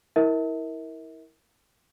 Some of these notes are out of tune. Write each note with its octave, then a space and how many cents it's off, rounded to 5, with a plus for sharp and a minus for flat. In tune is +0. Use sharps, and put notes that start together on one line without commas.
E4 -25 A#4 +0 E5 -40